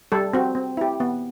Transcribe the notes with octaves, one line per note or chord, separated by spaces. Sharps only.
G3 A4
C4 F#4
C4
E4 G4
B3